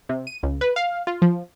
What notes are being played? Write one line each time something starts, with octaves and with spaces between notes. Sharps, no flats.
C3
D#7
C#2
B4
F5
F4
F3